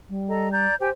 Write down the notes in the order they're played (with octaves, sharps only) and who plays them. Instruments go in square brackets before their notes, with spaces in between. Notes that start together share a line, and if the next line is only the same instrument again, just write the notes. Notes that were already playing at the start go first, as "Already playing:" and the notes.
[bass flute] G3
[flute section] A4 D#5 A#5
D5 A#5 G6
[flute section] G4 G5 G#5 [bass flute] C5